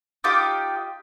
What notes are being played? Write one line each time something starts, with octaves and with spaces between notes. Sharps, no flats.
D#4 F4 G4 D6